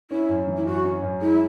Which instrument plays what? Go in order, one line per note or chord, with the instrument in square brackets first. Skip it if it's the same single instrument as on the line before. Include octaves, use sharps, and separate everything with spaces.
[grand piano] C#4 [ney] E4
[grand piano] F#2
E3
[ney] E4
[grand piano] F#2 [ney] F#4
[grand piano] C#4
F#2
[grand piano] G#3 [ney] E4